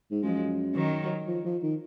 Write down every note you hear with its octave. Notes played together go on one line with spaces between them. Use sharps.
G#2
F#2 F3 G#3
D#3 F#3
F3
F3
D#3